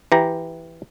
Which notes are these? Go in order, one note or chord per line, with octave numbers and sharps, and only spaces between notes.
E3 G4 A#5